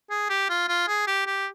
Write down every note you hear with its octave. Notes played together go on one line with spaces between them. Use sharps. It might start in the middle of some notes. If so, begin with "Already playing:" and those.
G#4
G4
F4
F4
G#4
G4
G4